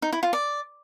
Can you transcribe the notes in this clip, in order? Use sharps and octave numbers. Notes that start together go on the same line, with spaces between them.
D#4
E4
F4
D5